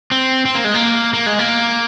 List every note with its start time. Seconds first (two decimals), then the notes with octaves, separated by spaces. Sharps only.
0.11 C4
0.45 C4
0.55 A#3
0.65 G#3
0.74 A#3
1.14 A#3
1.26 G#3
1.39 A#3